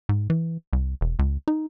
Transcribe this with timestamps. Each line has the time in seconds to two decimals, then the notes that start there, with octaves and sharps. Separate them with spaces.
0.09 G#2
0.30 E3
0.73 C2
1.01 E1
1.19 C#2
1.48 D#4